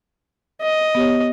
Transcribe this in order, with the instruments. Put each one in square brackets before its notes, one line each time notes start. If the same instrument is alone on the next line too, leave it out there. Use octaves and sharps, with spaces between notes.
[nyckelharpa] D#5
[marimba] B3 G4 C#5